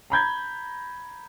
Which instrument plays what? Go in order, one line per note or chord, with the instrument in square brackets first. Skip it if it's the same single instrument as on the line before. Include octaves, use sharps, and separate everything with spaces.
[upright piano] A#5 B5 G6 G#6